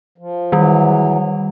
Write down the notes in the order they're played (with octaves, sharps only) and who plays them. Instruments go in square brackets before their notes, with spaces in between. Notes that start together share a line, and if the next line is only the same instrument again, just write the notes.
[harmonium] F3
[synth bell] D#3 G3 [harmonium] E3 F#3